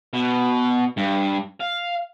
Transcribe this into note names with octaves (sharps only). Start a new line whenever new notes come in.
B2
G2
F5